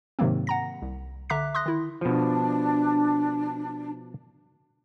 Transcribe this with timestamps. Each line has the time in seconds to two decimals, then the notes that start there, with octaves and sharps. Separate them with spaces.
0.19 G#2 C3 D#3 F#3 A#3 C4
0.47 F#5 A#5 A#6
0.82 C2
1.30 D3 E5 A#5 D6 F#6 B6
1.55 C6 D#6 F#6 A#6
1.66 D#3 E4
2.01 B2 F3 D4